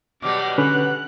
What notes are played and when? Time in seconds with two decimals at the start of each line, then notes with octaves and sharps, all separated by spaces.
0.22 B2 F#3 G3 D6
0.58 D3 C#4 B4 F#6